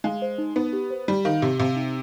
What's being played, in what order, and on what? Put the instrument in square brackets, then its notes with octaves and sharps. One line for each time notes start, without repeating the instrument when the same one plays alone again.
[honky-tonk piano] G#3 [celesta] F5
[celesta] C5
D#4
[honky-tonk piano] B3 [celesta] D#4
[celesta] G4
C5
[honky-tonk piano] G3 [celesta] G4
[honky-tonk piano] D#3 [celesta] F5
[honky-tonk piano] C3 [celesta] G4
[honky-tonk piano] C3 [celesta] F5
[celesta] D#4